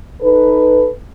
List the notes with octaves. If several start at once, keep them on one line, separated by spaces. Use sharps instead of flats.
D#4 A4 B4